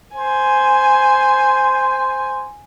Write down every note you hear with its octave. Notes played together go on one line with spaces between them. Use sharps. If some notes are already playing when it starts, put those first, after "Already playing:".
C5 G#5